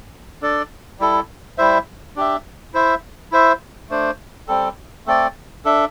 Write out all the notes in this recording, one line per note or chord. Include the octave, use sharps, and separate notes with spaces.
D4 A4 D5
G3 E4 A4
G3 E4 C5 E5
D4 G4 E5
E4 C5 E5
E4 C5 E5
A3 D4 C5
G3 C4 A4
A3 C4 A4 D5
D4 A4 E5